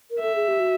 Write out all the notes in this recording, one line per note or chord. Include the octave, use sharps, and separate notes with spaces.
A#4
A4 E5
G#4
G4
F#4